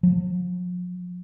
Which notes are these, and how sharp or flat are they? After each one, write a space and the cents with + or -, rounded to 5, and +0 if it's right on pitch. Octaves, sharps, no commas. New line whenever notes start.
F3 +45